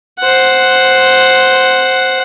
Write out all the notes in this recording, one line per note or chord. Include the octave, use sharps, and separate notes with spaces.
C5 F#5